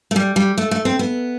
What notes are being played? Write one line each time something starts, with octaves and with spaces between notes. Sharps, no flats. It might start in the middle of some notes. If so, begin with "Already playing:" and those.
A3
G3
G3
A3
A3
C4
B3